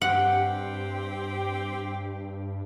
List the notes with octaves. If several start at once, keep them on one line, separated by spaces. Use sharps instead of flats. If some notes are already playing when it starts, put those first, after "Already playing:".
G2 C4 G4 F#5